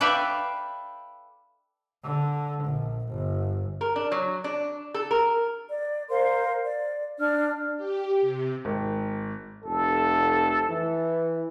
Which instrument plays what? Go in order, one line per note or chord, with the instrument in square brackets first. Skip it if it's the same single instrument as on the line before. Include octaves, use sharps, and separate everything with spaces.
[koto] A4 B4 D5 E5 F5 G5
[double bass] D3
A#1
G1
[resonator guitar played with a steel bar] A#4
D4
F#3
D4
A4
A#4
[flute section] D5
A#4 C5 F5 C6
D5
D4 D5 F6
[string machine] G4
C3
[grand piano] G#1
[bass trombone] F1 [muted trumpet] A4
[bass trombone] E3